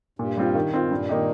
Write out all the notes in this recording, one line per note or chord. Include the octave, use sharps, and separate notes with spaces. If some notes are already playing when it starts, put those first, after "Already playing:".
G2 A#2
G3 C4 F4
D#3
C4 F4
G2 A#2
D#3 A#3 D#4 G4